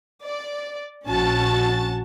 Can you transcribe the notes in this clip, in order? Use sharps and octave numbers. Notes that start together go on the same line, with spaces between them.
D5
A#1 C#4 F#4 A5 A6